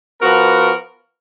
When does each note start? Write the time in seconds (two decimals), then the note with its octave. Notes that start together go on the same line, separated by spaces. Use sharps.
0.20 F3 B3 F#4 A#4